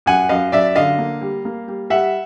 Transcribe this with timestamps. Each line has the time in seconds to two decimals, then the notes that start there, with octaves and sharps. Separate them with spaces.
0.06 F#2 F#5 G#5
0.29 F#2 D#5 F5
0.52 F#2 D5 E5
0.76 D3 D#5 F5
0.98 A#3
1.21 G3
1.45 A#3
1.68 G3
1.90 G3 E5 F#5